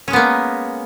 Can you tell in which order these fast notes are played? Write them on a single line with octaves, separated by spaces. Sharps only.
C#4 G#3 B3 A#3